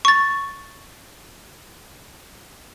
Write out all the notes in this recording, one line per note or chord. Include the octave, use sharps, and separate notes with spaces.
C#6 A6